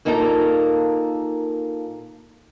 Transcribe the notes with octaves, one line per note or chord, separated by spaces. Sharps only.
A#2 A#3 D#4 E4 A4 A#5